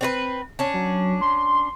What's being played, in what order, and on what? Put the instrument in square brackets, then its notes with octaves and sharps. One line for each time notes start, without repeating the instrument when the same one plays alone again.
[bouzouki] C4 D4 B4
C#4 D4
[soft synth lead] F#3
C6